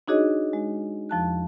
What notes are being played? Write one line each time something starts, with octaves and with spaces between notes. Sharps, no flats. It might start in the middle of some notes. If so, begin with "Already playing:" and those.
D4 D#4 F#4 G#4 C#5 D#5
G#3
E2 F3 A5 F#6